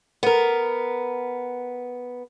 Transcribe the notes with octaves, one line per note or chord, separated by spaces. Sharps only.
B3 A#4